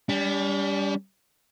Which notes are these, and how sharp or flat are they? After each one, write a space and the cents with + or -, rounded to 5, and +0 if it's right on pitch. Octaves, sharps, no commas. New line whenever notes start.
G3 +15 D4 -45